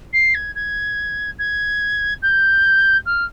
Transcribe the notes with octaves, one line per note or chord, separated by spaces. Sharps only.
C7
G#6
G#6
G#6
G6
F6